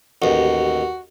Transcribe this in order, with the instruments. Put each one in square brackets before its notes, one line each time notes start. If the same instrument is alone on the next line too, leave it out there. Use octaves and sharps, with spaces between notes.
[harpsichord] A1 D#2 [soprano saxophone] F#4